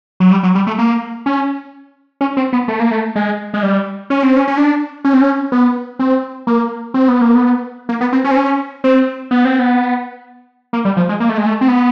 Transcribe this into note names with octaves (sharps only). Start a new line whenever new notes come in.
F#3
G3
F#3
G3
A3
A#3
C#4
C#4
C4
B3
A3
A#3
A3
G#3
G#3
G3
C#4
C4
C#4
C#4
D4
C#4
C4
C#4
B3
C4
A#3
C4
B3
A#3
B3
A#3
B3
C4
C#4
C4
C#4
C4
B3
C4
B3
A#3
G3
F3
G#3
A#3
A3
G#3
A3
C4
B3